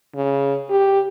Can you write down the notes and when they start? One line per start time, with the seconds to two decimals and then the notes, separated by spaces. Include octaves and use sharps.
0.16 C#3
0.70 G4